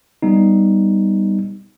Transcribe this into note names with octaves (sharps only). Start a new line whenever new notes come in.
G3 B3 D#4